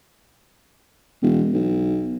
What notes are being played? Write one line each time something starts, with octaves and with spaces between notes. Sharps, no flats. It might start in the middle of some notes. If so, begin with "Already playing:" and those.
E1
B1